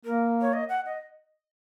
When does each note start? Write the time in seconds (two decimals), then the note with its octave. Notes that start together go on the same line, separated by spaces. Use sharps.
0.05 A#3 A#4
0.41 C#5
0.53 D#5
0.69 F#5
0.86 D#5